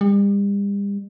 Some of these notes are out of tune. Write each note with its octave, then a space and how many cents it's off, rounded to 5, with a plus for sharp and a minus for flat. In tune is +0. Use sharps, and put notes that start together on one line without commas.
G3 +40